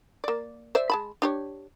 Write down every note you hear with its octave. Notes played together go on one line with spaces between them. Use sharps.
A#3 D5
C5 D5 E5
G#3 A5 B5
D4 G4 C#5